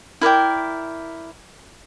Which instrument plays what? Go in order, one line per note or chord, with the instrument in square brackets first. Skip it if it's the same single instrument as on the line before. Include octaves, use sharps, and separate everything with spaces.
[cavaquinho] E4 A#4 D5 G5